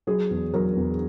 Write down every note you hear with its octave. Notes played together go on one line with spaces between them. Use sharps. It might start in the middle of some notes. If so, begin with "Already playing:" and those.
F#3 G#4
E2
F#3 A#4
E2